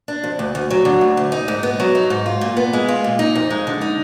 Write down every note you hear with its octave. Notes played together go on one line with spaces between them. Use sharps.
D4
F2
D2
D2
F#3
D3
D2
D2
D#4
G#2
B3
F#3
D#4
G#2
F4
A#2
B3
G#3
F4
A#2
D#4
F2
G#3
D3
D#4